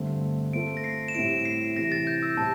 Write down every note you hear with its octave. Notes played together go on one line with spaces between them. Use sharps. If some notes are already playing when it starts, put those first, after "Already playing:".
Already playing: G2 D3 A3 C4
A3 C4 F4 A4 D7
A#6
C7
E7
A2 G3 C4 E4 D7
C7
C3 E3 G3 A#6
A6
G6
E6
A2 G3 C4 A5